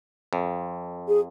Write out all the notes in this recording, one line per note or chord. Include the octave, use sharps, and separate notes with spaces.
F2
G#4